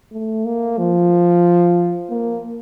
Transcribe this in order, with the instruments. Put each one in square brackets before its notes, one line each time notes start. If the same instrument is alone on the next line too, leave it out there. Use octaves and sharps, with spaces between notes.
[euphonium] A3
A#3
F3
A#3